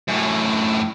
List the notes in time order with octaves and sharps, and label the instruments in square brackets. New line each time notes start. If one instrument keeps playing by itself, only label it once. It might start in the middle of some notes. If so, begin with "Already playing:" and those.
[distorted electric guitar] F#2 A2